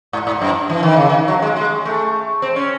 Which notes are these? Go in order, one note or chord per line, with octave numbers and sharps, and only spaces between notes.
G#2
G#2
F#2
E3
D#3
C#3
D#3
F#3
G#3
G#3
A3
C4
C#4